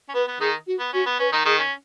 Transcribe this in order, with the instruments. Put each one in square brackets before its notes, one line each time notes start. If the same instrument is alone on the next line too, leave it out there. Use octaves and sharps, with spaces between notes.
[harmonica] C#4
[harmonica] B3 [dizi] B4
[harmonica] B3
[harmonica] D#3 D#4 [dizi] G#4
[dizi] F#4
[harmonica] B3
[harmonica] C#4 [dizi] F#4
[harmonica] B3
[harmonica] C#4 [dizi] B4
[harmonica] D#3 D#4
[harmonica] D#3 D#4 [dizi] G#4
[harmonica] C#4